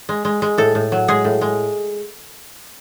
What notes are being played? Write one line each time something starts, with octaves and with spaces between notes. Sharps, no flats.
G#3
G#3
G#3
A2 A4
A2
F#3
G#3 G#4
A2
G#3